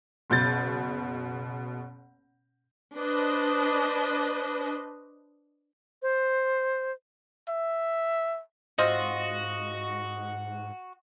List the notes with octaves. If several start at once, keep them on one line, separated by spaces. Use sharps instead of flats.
F#1 B2 G6 A6
D4 B4 C5 D#5
C5
E5
G#2 C4 F4 F#4 D#5